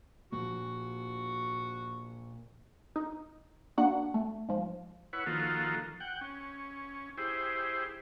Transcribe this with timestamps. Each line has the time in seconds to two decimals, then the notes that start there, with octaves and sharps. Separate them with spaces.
0.32 A#2 F3 A#3 F#4
2.96 D#4
3.77 A#3 D4 F#4 F#5
4.14 A3
4.49 G#2 F3
5.13 E4 B4 C#5 F#5
5.26 D#3 F3 A#3 F4 F#4 A4
6.00 F#5 G5
6.21 C#4
7.18 E4 G4 G#4 C5